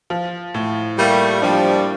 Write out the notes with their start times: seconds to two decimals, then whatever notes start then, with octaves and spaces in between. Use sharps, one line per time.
0.10 F3
0.54 A2
0.98 G3 A3 A#3
1.42 F3 G3 D4